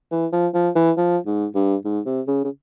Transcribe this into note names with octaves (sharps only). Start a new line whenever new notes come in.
E3
F3
F3
E3
F3
G#2
G2
G#2
C3
C#3
C#3